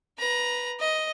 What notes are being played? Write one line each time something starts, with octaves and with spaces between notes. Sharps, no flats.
B4 A#5
D#5